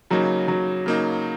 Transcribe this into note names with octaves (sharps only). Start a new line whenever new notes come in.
C#3 F#3 A#3 D#4
F#3
C#3 A#3 D#4